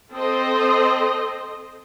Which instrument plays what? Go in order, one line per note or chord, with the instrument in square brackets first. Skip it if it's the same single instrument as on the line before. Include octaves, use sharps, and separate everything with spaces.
[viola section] C4 A4 C5 D#5